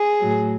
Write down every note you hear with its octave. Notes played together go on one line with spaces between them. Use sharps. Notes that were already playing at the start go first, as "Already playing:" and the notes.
Already playing: G#4
A2 F#3